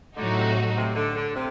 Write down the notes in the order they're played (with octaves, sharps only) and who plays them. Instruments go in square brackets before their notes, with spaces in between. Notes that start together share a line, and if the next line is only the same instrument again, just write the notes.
[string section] A2 F#3 A3 D#4 F#4 [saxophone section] D3
[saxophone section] C3
C3
D3
D3
C3